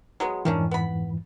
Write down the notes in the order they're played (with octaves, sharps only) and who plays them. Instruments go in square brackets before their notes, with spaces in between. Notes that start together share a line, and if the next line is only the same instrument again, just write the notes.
[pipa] F#3 G#3 B3
[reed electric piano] F2 G#2 E3 [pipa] D#3 C#4 D4
[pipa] B3 B5